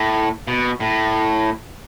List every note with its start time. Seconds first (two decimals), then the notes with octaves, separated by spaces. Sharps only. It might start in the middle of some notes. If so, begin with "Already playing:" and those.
Already playing: A2
0.47 B2
0.80 A2